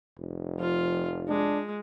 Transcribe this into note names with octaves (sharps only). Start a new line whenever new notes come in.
F1
F3 F4
G#3 D4